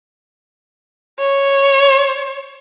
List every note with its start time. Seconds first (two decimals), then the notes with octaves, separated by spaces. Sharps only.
1.19 C#5